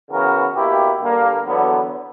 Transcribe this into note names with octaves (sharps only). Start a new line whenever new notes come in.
C#3 E3 B3 F#4 A#4
B2 A#3 E4 G4
G2 D3 A#3
E2 D3 F#3 B3